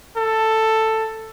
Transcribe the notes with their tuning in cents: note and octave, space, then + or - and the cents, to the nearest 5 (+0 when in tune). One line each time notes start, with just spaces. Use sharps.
A4 +10